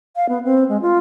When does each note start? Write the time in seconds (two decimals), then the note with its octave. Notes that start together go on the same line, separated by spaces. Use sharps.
0.16 F5
0.29 B3
0.45 C4
0.69 G#3
0.82 F4